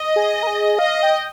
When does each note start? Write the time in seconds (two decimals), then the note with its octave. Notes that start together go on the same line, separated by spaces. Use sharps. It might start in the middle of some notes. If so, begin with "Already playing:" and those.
Already playing: D#5
0.16 G#4
0.43 A#4
0.47 G#4
0.78 D#5 F5
1.03 G5